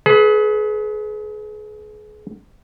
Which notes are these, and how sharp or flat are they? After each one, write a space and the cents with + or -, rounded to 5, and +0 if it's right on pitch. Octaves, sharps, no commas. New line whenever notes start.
G#4 +35 B4 +0